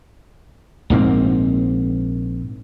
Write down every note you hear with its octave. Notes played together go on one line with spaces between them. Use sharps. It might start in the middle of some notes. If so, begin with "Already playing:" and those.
A#1 G#2 A#3 C4